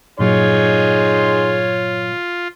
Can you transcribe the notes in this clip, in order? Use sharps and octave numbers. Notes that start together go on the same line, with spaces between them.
G2 A#2 F#3 D#4 F4 G#4 C#5 C6